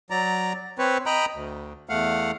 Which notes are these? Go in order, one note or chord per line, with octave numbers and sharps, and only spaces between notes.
F#3 D5 A#5
C4 B4 C#5
D#5 G5 A#5 B5
D2
E2 A3 F5 F#5